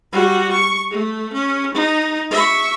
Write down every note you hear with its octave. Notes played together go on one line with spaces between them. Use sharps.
G3 F#4
C#6
A3
C#4
D#4
E5 C#6